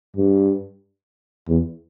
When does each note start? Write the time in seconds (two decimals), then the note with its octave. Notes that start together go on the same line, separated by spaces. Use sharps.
0.16 G2
1.48 E2